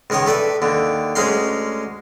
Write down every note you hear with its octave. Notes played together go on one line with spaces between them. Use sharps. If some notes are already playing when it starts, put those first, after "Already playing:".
C#2 D#3 A#4 C#5 D#6
A4 B4 D5 E5
D#2 D3
D2 G#3 C#4 F5 A#5 C6